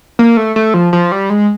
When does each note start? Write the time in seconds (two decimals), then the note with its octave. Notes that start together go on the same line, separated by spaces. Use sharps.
0.19 A#3
0.37 A3
0.56 A3
0.74 F3
0.93 F3
1.12 G3
1.30 G#3